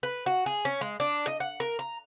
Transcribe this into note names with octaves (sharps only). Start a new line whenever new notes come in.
B4
F#4
G#4
C#4
G#3
D4
D#5
F#5
A#4
A#5